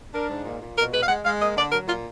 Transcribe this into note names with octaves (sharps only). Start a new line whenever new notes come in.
D4 A#4
G#2
A#2
A#2
B2 A#4
G#3 B4
F5
G#3 F#5
G#3 F5
A#3 D#5
D3 D5
F#3 A#4
A#2 F4